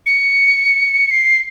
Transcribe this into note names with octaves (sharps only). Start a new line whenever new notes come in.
C#7
C7